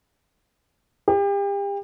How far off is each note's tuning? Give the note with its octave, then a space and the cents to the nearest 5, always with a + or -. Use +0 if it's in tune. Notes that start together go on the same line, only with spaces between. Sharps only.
G4 +35